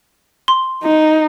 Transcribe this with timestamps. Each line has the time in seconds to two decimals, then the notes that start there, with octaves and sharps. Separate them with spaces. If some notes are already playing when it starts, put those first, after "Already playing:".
0.48 C6
0.83 D#4